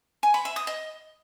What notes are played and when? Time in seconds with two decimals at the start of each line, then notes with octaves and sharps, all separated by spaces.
0.23 G#5
0.34 B5
0.45 E5
0.56 D#6
0.67 D#5